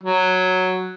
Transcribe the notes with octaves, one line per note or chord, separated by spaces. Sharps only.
F#3